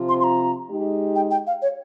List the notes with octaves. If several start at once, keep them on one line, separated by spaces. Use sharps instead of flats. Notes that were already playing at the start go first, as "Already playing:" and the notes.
Already playing: C3 F3 C4 F4
C6
C6
A#5
G#3 D#4 G4
G5
G5
F5
C#5